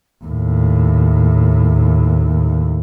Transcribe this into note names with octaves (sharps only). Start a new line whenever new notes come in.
D#2 A2